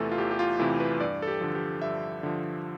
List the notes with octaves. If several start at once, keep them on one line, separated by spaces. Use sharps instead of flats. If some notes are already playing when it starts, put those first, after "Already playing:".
Already playing: E2 C3 E3 A3 F4 A4
F4
E2 G4
G4
F4
C3 E3 A3 E4
B4
G2 D5
A4
G4
D3 F3
G4
G2 E5
D3 F3